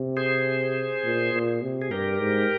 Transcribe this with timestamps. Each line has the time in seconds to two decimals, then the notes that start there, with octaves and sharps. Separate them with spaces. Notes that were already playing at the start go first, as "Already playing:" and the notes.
Already playing: C3
0.17 G#4 C5
1.04 A#2
1.33 A#2
1.62 C3
1.82 G#4
1.91 G2 G4 A#4
2.20 G#2